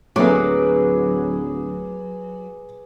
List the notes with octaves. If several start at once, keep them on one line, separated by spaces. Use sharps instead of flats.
D1 F#3 A3 A#3 G#4 B4 D6